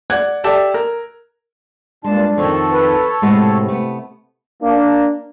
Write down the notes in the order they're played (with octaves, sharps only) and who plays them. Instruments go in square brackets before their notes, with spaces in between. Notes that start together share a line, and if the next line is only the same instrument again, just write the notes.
[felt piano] D5 F#5 F#6 G#6
G4 A4 D5 E5 A5
A#4
[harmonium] G2 A#2 A5 [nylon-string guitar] G#3 [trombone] D4
[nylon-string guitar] F2 D#3 [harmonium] A4 C#5
[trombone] B4
[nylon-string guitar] A2 G#3 B3 [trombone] C3
[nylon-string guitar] A3 B3
[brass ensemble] A#3 D4